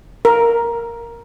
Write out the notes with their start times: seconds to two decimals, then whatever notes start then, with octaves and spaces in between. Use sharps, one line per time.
0.25 A#4